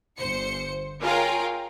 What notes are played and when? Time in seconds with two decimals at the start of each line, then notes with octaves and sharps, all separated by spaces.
0.18 G1 C5 C#7
1.01 F4 G#4 A#4 C#5 F5 G5